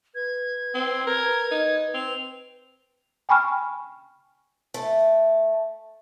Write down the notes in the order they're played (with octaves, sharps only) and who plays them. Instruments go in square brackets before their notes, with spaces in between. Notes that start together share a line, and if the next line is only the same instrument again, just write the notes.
[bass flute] B4 [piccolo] G#6
[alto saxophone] C4
[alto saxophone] A#4 [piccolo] G#6
[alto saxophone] D#4
[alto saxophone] C4 [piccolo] F7
[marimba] G5 G#5 B5 C#6 F6
[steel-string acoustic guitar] A3